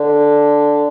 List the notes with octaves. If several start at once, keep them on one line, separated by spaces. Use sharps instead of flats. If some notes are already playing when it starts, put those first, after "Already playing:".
Already playing: D3